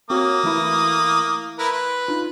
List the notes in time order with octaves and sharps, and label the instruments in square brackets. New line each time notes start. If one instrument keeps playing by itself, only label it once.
[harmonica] A#3 D#6 [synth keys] C4 F#4 C#5
[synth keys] E3 A3 E4
[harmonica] E4 A#4 B4
[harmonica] B4 [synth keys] C6
[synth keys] D4 D#4 F4